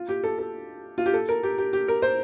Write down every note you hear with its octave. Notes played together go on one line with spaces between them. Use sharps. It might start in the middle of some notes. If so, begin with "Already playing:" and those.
Already playing: F4
G4
A4
A4
F4
G4
A4
A#4
G4
G4
G4
A#4
C5